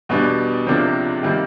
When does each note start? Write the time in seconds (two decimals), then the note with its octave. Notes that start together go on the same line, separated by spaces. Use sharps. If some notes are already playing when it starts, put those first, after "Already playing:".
0.09 E2 B2 G3 B3 D4
0.67 C#2 C3 F3 A#3 D4
1.23 C3 D#3 G3 A#3